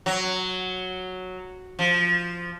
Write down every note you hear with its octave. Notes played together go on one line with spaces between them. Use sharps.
F#3
F3